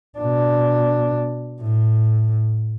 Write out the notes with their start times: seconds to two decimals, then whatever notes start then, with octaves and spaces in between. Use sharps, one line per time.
0.18 B2 D4
1.61 A2